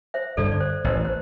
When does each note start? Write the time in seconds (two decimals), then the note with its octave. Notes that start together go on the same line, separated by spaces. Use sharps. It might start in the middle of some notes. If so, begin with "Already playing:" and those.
0.14 C5 E5
0.37 G2 D3 A4 D5
0.52 D5
0.60 C5
0.84 A1 C5
1.05 C5